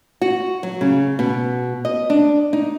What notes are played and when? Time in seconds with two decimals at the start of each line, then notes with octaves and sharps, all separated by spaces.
0.21 F#4
0.63 F#3
0.81 C#3
1.19 B2
1.85 D#5
2.10 D4
2.53 D#4